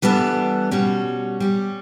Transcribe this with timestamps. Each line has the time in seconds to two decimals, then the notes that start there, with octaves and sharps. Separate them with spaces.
0.02 E3 G3 B3 D4 A4
0.71 B2 G3 C#4 F#4
1.40 G3 C#4 G4